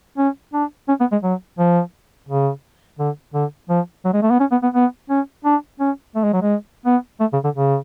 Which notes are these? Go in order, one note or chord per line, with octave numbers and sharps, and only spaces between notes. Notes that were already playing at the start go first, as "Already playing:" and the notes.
C#4
D4
C#4
B3
G#3
F#3
F3
C#3
D3
D3
F3
F#3
G#3
A3
B3
C#4
B3
B3
B3
C#4
D4
C#4
A3
G#3
F#3
G#3
B3
A3
C#3
D3
C#3